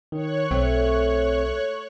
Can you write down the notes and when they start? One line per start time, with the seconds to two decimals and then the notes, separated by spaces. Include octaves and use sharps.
0.12 D#3 C#5 C#6 F#6
0.51 B1 A3 C4